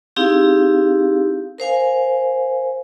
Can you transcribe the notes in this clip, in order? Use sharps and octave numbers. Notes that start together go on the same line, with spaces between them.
C4 D#4 E4 G4 G#4 F5
A#4 C5 F5 G#5